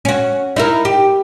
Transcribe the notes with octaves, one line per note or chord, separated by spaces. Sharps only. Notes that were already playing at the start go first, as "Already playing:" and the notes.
C#4 F#4
D#4 E4 A#4
G4